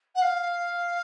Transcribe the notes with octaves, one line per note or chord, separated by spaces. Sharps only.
F#5
F5